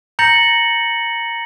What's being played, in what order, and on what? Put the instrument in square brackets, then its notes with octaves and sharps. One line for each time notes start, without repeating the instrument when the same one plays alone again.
[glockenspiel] A#5 G6 A6 A#6 C#7 F#7